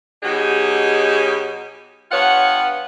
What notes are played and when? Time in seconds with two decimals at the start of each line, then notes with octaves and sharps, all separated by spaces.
0.23 B2 F#3 D#4 G4 G#4
2.11 G2 B3 F4 C#5 F#5